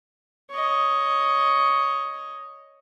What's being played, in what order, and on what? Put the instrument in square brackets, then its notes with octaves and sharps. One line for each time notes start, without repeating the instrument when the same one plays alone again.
[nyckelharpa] C#5 D#5